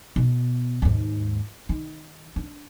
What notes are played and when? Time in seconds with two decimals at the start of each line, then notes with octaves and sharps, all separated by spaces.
0.16 B2
0.82 D#2 G#2
1.69 D#3
2.36 D4